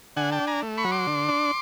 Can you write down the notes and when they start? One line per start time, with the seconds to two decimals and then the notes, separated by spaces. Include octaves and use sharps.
0.16 D3 F#5 G#5
0.32 G5 A5
0.40 D4
0.47 G#5 A#5
0.63 A3
0.77 B5 C#6
0.84 F#3
0.91 C6 D6
1.07 D3
1.29 D4